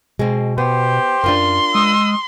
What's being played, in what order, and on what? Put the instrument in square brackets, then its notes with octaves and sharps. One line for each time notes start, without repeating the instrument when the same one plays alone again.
[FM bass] B2 [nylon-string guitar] G#3 C4
[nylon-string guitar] B3 [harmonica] G4 C5
[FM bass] F#2 [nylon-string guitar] D4 F4 A#4 [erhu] C6
[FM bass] G#3 [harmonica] D#6 E6